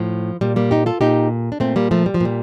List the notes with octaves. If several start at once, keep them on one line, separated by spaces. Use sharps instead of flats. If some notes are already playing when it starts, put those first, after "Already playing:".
Already playing: A2 F3
A#2 G3
G3 A#3
D#4 G4
F4 A4
A#2 D#4 G4
D4
A#2 A3 C4
G3 A#3
F3 A3
G3
F3
A#2 G3